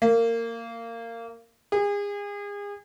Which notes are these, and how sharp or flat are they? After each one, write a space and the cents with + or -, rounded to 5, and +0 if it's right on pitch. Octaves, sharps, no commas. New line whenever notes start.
A#3 -20
G#4 -35